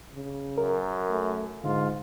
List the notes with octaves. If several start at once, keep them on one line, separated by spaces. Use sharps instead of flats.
C#3
F#2 A#4
A3
G#2 D3 F4